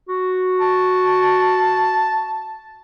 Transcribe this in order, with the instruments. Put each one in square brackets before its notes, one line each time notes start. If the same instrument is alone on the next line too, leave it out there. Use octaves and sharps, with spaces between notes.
[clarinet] F#4
[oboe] A5